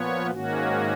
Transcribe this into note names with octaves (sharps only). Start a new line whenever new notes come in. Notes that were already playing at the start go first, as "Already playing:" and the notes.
Already playing: A#2 F3 B3 C#5
G#2 D#3 A#3 C#4 F#4